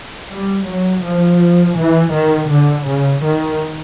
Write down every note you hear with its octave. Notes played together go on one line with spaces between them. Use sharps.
G3
F#3
F3
E3
D#3
D3
C#3
D#3